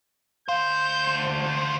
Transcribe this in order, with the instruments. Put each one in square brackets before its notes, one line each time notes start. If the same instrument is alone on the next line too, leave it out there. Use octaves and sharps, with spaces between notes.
[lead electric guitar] D2 C5 [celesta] F5 [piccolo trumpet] G6